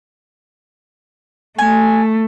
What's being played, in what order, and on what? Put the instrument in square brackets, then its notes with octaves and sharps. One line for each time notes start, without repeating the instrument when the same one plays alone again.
[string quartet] A3 [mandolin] G#5